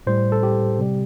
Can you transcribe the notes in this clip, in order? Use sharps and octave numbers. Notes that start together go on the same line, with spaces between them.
A2 G3 C5
A4
G4
C3 G3